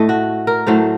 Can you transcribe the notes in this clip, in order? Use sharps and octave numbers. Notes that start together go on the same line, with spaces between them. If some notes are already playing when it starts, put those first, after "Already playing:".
Already playing: A2 A3 D#5
F#4
A#4
A2 F#3 A3 C5